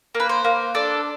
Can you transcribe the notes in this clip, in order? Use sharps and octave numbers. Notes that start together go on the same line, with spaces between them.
A#3
B4
C5
A#3
D4 A4